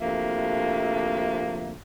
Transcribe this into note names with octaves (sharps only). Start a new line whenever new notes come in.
D2 C3 F3 A#3 E5